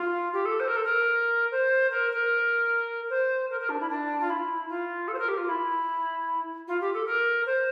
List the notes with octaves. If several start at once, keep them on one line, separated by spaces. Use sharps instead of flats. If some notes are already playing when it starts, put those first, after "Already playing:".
Already playing: F4
G4
A4
C5
A#4
A4
A#4
C5
A#4
A#4
C5
A#4
A#4
D4
E4
D4
F4
E4
F4
A4
C5
A#4
G4
F4
E4
F4
G4
A4
A#4
C5